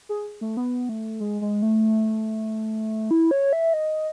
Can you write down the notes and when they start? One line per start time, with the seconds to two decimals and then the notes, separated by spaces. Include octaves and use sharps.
0.09 G#4
0.41 A3
0.57 B3
0.89 A3
1.20 G#3
1.41 G#3
1.62 A3
3.11 E4
3.31 C#5
3.53 E5
3.73 D#5